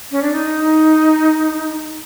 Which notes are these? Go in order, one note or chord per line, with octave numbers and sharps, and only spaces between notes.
C#4
D4
D#4